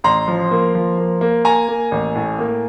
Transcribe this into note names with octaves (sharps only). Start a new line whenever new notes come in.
A1 A#5 C6
F3
A#3
F3
A#3
A#3
A#3 G#5 A#5
A#3
A1
A2
A#3